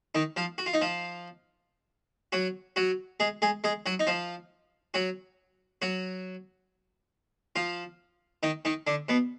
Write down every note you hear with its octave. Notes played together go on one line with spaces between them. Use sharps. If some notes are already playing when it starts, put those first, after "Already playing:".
D#3 D#4
F3 F4
F#4
F4
D#4
F3 F4
F#3 F#4
F#3 F#4
G#3 G#4
G#3 G#4
G#3 G#4
F#3 F#4
D#4
F3 F4
F#3 F#4
F#3 F#4
F3 F4
D#3 D#4
D#3 D#4
D3 D4
B2 B3